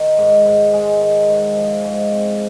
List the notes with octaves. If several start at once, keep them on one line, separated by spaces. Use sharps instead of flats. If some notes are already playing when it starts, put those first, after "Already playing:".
Already playing: D#3
G#2
G#2
G#3
D#3
G#2
F3
G#2
C4